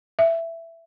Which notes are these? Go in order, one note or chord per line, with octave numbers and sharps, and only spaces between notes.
E5